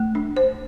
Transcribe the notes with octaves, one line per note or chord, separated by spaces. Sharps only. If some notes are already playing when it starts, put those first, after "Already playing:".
Already playing: A3
D4
C5